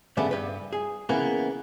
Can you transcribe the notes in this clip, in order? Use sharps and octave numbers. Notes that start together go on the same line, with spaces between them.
G2 C#3 G3 A3 B3
G2 B4
G#4
C#3 E3 A#3 B3